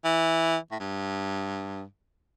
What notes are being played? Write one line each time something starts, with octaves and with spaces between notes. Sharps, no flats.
E3
A2
G2